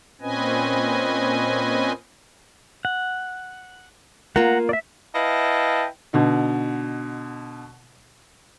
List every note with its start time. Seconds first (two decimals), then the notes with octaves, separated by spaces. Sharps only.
0.21 A#2 C4 C#4 B4 D#5 G#5
2.85 F#5
4.36 A#3 F4 F#5 A#5
4.69 D5 E5
5.15 E4 B4 D#5 F5 G5 A5
6.13 B2 D3 D#4